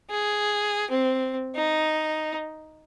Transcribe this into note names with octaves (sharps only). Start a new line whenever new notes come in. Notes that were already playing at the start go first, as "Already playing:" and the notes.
G#4
C4
D#4